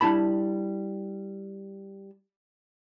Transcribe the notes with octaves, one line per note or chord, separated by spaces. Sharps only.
G3 D4 E4 A5 B5